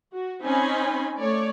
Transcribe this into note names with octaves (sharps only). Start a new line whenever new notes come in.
F#4
C4 C#4 D#4 G#5 B5 C6
A3 C#5 D5